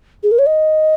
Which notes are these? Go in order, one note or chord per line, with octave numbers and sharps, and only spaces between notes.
G#4
A#4
C#5
D#5